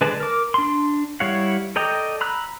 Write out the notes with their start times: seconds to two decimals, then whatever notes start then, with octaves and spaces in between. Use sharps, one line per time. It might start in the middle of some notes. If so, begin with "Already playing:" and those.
0.01 D3 G#3 B4 D5 A5
0.20 A#4 D6
0.54 D4 C6
1.20 G3 E4 C#5 F5 F#5
1.76 A4 D5 D#5 G5 A#5
2.21 A#5 B5 E6 F#6